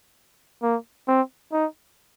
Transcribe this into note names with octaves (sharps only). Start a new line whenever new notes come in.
A#3
C4
D#4